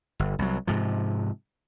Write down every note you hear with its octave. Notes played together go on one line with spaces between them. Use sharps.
G1
C2 F#3
G#2 C3 F3